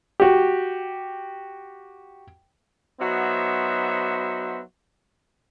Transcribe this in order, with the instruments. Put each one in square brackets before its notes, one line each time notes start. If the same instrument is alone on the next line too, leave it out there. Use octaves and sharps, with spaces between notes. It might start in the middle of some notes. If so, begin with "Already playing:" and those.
[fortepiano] F#4 G4
[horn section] F#3 B3 D#4 F#4 C5 E5